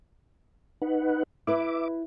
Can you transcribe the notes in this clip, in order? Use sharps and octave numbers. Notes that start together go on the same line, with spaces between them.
D#4 B4 F#5
E4 B4 E5 D6